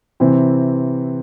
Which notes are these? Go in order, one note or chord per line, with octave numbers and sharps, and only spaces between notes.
C3 E3 C4